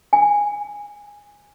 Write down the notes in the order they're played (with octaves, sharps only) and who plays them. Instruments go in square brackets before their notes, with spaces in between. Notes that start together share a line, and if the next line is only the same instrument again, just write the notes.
[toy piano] G#5